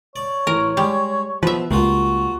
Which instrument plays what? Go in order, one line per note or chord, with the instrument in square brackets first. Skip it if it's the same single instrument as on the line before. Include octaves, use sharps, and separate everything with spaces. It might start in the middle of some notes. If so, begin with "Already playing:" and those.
[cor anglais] C#5 [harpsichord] D5
[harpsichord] A1 [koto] A#4
[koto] G3 [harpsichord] G#3
[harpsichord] B2 [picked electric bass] F3 [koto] B4 E5
[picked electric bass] C#2 [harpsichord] G3 A#3 F4 [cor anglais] F#4